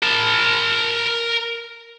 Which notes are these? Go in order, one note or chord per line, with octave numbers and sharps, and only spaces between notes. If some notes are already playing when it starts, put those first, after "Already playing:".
A#4 A5